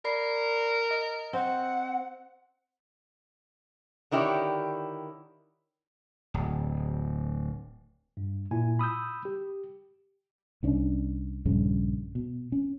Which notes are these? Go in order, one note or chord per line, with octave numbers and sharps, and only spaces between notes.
A#4 D5 B5 C7
D#5
C4 F#5
D3 D#3 E4 G4 C#5 D5
D1
G2
A#2 E4 G#5
B5 D#6 E6 G6
G4
C2 C#4 D4
A#1 G2 C#3
B2
C#4